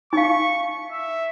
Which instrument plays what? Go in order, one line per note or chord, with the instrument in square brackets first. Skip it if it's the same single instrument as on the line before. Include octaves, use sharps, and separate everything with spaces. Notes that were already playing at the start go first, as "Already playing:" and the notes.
[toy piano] D#4 F5 [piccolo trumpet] C#6
[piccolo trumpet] E5